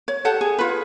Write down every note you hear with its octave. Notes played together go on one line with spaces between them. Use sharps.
C#5
G4 A4 F#5 A5
G#4
F4 B4